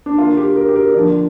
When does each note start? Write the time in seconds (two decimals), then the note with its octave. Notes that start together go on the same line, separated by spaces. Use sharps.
0.06 D4
0.18 D3 A#3 F4
0.37 G4
0.56 A#4
0.68 G4
0.76 A#4
0.94 D3 F3 A#3 D5